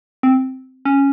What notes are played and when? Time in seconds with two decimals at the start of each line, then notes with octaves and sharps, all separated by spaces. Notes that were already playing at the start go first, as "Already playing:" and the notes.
0.23 C4
0.85 C#4